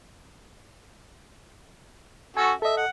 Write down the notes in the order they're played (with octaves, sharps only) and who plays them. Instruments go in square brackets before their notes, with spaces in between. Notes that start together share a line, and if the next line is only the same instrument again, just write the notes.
[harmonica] C#4 F#4 A4 [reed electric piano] G#5
[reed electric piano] A4 D#5 [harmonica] E5
[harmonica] F#5